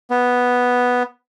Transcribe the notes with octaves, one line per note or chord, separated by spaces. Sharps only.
B3